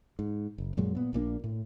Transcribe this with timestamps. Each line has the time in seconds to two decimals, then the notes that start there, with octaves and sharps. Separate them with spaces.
0.19 G#2
0.58 F#1
0.77 F#2 A#2 F#3 G#3
0.95 A#2 B3
1.13 A#1 A#2 A#3 D4
1.44 A2